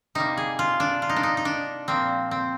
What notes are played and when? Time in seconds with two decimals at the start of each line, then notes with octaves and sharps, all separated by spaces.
0.15 C3 G3 A#3 D#4
0.37 G#4
0.59 F4
0.80 D4
1.02 F4
1.09 D#4
1.16 D4
1.23 D#4
1.37 D#4
1.45 D4
1.88 A#2 F3 A#3 C4
2.31 C4